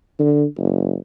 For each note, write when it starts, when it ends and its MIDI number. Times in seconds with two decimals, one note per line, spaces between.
0.19 0.45 50
0.58 0.95 30